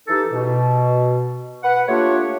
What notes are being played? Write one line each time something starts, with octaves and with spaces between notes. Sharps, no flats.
E3 D#4 G4 A4
B2
B4 F#5
A3 A#3 D4 F4 G4 C#5